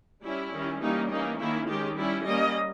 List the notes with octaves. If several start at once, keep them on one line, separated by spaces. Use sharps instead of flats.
G3 C#4 E4
D#3 G3 C#4
E3 G3 A#3 C#4 D#4
E3 A#3 C#4 D#4
D#3 A#3 C#4 E4
D#3 G#3 C#4 G4
G3 C#4 E4
G3 A#3 C#4 D#5